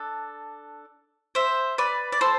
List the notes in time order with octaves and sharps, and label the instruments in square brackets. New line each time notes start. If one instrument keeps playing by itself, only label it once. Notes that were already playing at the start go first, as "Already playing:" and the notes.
Already playing: [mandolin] D4 A4
C5 E5
B4 D5
D5
A4 C5